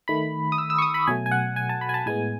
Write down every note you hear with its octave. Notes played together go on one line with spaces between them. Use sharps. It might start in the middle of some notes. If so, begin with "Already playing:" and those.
D#3 A3 B5
D#6
E6
E6
C#6
D#6
B5
B2 F#3 A3 G#5
G#5
F#5
G#5
A5
B5
G#5
A5
A2 G#3 B3 G#5